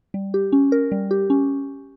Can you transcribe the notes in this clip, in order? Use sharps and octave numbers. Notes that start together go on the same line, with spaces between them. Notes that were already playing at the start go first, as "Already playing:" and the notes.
G3
G4
C#4
A#4
G3
G4
C#4